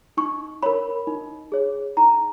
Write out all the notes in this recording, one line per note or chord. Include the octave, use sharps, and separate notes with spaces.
D#4 C#6
A#4 C#5 B5
D#4
G#4 C#5
D#4 A#5